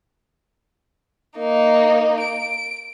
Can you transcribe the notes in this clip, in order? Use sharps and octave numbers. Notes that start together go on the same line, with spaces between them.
A#3 D#4
D7